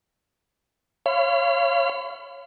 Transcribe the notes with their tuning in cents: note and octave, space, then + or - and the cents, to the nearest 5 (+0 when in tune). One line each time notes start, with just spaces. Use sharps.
C#5 +0 F5 -30 B5 +45